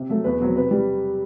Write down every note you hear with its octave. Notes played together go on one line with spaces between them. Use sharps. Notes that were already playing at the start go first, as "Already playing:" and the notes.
Already playing: C3
F#3 A3
E2 B4
B2 F#3 C4
C3 B4
G3